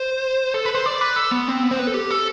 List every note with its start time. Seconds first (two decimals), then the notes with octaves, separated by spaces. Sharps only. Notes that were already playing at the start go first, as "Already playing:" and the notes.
Already playing: C5
0.54 A4
0.65 B4
0.75 C5
0.86 D5
1.01 B4
1.16 A4
1.32 B3
1.48 C4
1.63 B3
1.71 C5
1.79 B4
1.87 A4
1.94 G4
2.11 A4